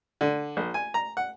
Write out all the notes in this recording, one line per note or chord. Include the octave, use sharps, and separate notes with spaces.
D3
A#1
G#5
A#5
F#5